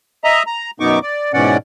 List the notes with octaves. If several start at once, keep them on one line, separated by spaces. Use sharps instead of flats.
D#5 E5 A#5
A#5
F#2 B2 B3 D#4 C#6 D6
D5
G#2 B2 E3 C#4 D5 F#5